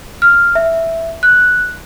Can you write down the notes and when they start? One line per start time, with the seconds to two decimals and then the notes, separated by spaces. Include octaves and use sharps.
0.22 F6
0.55 E5
1.23 F#6